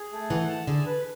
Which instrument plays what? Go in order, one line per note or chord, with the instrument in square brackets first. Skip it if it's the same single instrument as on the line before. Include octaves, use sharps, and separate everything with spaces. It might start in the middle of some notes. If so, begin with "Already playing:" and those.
Already playing: [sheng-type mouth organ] G#4
A3
[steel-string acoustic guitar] E3 [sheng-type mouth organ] F#5
[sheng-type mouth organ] A5
[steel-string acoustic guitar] D3 [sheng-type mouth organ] G#4
[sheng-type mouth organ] B4